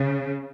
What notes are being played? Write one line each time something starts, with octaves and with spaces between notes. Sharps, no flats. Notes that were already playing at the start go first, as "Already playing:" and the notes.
Already playing: C#3